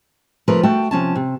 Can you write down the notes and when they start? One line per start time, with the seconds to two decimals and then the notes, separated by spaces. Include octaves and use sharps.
0.48 C3 F3 A3 A#4 B4
0.63 A3 F#4 G5 A5
0.91 C3 F3 C#4 A5
1.16 C3